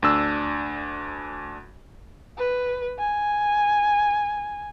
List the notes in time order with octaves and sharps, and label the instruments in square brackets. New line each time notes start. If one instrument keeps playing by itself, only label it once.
[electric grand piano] D2 D4 E6
[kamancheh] B4
G#5